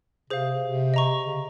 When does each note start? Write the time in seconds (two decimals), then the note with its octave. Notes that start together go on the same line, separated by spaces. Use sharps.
0.30 C3 G#4 C5 F5
0.62 C3
0.94 D#5 A#5 C#6
1.26 C#3